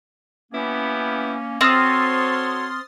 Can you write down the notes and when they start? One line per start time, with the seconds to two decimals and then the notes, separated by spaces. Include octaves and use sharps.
0.52 A#3 B3 C#4 E4 G4
1.61 C4 F#4 A4 C#5 C6 D#6 F6 A6